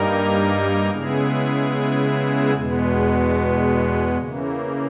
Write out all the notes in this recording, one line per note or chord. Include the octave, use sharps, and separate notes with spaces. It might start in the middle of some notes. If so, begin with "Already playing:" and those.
Already playing: G2 G3 A#3 D#4 A#4
C#3 G#3 B3 E4 G#4
E2 B2 G#3 B3
C#3 E3 A#3